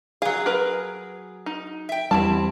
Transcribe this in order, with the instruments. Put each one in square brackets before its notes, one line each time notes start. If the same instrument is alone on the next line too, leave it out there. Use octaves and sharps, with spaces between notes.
[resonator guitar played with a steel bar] F#3 G#4 [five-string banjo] F5
[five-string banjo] A#4 B4
D#4
[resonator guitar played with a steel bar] E5 G5
[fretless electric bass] E2 G3 [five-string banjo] C4 E4 A5